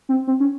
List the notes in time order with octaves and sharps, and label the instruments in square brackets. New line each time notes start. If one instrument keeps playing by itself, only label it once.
[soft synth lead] C4
C4
C#4